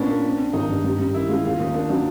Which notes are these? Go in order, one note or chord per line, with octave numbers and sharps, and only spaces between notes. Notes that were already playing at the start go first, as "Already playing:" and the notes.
Already playing: A#2 B3 C#4 D4
A#3
C4
C4
G#1 D#4
G2
G3
G3
D#3 E4
G#3 F4
D#2 F4
D#2 D#4
A#3 D4
F#3 D4